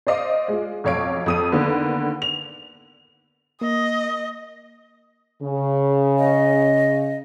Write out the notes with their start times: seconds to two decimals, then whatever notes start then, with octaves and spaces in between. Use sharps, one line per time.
0.07 C5 D5 D#5 F5 D6
0.48 G#3 F4
0.84 B1 F2 C#5 F5 D7
1.26 F2 D#6 D#7
1.52 D3 D#3 A#3 B3
2.22 F7
3.61 A#3 D#5
5.42 C#3
6.18 D#5